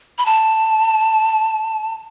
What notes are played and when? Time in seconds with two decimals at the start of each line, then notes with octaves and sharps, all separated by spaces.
0.18 B5
0.26 A5